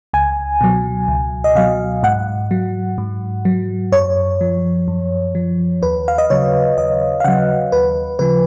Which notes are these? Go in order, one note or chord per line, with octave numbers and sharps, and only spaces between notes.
C#2 G#5
B2 F#3
C#2
D#5
B2 F#3 F5
G#2 F#5
F#3
G#2
F#3
F#2 C#5
F3
F#2
F3
D#2 B4
F5
D#5
C#3 F#3 C#5
D#2 D#5
F5
C#3 F#3 F#5
D#2 B4
C#3 F3 B4